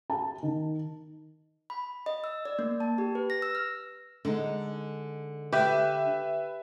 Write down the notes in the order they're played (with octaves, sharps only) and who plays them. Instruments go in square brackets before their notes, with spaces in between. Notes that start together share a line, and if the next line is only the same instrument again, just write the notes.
[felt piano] A5
D#3
[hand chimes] B5
D#5
E6
D5
A#3
A5
G4
B4
A#6
E6
F6
[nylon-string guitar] D3 G#3 D#4
[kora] G4 [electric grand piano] B4 E5